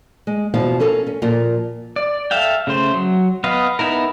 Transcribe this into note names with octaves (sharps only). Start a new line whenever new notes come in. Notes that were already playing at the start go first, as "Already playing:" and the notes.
G#3
E2 B2 F3 E4 F5
C#4 A4 A#4 F5
C#4
A#2 F3 F4 A#4
D5
A4 E5 F5 G5
C#3 A3 C5
F#3
B3 B4 D#5 F5
B3 D#4 E4 A#4